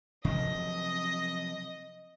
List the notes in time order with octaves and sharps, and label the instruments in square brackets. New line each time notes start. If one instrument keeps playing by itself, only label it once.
[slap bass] C3 F3 F#3 [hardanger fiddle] D#5